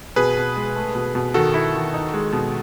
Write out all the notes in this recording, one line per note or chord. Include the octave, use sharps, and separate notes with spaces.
B2 G#4 B4
B2
G#3
A3
B2
B2
D#3 F#4 A4
E4
D#3
D#4
G#3
B2